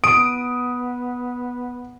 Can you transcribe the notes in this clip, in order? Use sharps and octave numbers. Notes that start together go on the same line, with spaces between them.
B3 D#6 D7